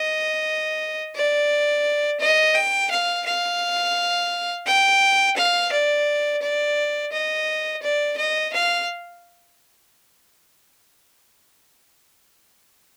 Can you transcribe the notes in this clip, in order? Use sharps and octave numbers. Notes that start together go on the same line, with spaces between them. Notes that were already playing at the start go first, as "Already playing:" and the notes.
Already playing: D#5
D5
D#5
G5
F5
F5
G5
F5
D5
D5
D#5
D5
D#5
F5